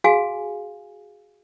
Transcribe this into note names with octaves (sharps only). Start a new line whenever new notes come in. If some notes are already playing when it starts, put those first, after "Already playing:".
F#4 G#4 F5 G#5